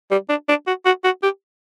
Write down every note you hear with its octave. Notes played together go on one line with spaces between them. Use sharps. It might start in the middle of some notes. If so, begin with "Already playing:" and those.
G3
D4
D4
F#4
F#4
F#4
G4